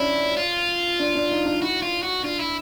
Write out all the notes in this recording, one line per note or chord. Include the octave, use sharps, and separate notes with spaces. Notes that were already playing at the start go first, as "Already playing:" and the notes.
Already playing: C#4 D4 E4
F4
D4
D4
D#4
D4
E4 F#4
F4
F#4
D4 F4
E4